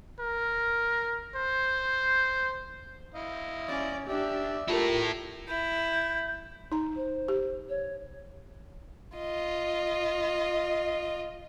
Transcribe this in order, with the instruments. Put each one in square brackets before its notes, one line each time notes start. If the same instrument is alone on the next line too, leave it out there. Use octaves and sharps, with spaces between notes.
[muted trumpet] A#4
C5
[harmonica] E4 D#5 F5
[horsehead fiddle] C#4 D5
[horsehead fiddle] D4 G4 [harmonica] D5 E5
[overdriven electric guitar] E4 A4 [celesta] F4 A#4 [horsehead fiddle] G4 A#5
[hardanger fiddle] E4 [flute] G6
[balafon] D#4 A#5
[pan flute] C5
[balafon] G4
[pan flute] C#5
[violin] F4 D#5